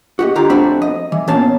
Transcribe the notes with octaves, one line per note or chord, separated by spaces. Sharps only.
F#4 G4 D#5
D3 F4 G4 A#5
F2 A3 C4 D4 F#4 B5
D#5
E3
A#2 B3 C#4 F5 A5